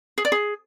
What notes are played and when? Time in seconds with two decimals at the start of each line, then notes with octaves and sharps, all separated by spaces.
0.18 G#4
0.25 D5
0.32 G#4